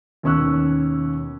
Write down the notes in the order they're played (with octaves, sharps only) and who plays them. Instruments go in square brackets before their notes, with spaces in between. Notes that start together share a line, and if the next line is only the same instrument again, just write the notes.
[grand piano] D#2 B2 C#4 C#6 E6 F#6